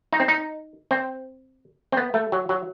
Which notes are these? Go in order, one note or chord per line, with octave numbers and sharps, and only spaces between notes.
D#4
C4
D#4
C4
C4
B3
A3
F#3
F#3